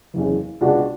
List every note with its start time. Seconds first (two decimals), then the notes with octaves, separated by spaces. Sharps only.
0.14 F#1 E2 C#3
0.61 C#2 B2 G#3 D4 F#4